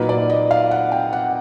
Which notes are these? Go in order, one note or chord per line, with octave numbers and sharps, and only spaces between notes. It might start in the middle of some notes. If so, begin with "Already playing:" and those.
Already playing: A#2 F#3 A#3 D#4 B4
D5
D#5
F5
F#5
G5
F#5